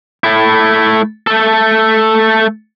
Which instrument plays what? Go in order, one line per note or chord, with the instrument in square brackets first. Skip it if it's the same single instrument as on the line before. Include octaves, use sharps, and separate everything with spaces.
[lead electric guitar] A3 E4
A3 A4